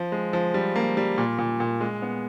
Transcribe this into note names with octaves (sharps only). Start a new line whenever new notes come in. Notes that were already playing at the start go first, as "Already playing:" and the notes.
Already playing: F3
G#3
F3
G3
A#3
G3
A#2
A#2
A#2
G#3
B3